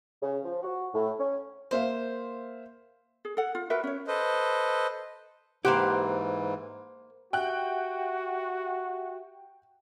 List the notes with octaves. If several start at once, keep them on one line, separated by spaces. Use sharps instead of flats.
C#3
F3
F#4
A2
C#4
A#3 C5 E5 F5
G#4
A4 F#5
F4
F#4 A#4 B4 E5
C#4 C#5
A4 B4 C5 D#5
G#2 E3 A#3 G4 C5 F#5
F#4 G4 E5 F#5 G5 F#6